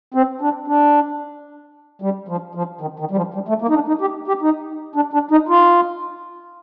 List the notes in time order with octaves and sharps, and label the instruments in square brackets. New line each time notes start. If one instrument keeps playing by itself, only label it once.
[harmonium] C4
D4
D4
G3
F3
F3
D#3
D#3
G3
F3
G3
A3
A#3
D#4
D4
D#4
G4
G4
D#4
D4
D4
D#4
F4